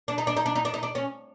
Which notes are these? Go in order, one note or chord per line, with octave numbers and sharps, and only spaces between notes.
D4
D#4
D4
D#4
D4
D#4
D4
D#4
D4
C#4